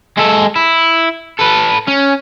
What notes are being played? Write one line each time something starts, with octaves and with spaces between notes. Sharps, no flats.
G#3 A4
E4
A4 B4
C#4